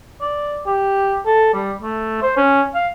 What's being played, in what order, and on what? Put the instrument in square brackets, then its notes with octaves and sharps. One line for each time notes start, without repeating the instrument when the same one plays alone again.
[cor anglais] D5
G4
A4
G3
A3
C5
C#4
F5